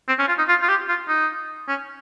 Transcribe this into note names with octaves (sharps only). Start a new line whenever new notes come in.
C4
C#4
F4
D#4
F4
F4
G4
F4
D#4
C#4